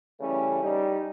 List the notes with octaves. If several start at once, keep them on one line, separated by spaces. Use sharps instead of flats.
C#3 E3 G3 A3 C#4
G3 D#4